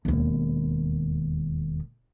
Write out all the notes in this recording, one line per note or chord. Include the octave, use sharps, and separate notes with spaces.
E1 D#2